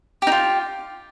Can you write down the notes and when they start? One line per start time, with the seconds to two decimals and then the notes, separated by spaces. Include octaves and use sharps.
0.22 G4
0.27 D#4
0.32 F4